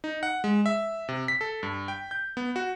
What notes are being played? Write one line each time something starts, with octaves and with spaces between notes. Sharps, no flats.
D#4
F#5
G#3
E5
C3
B6
A4
G2
G5
G6
B3
F#4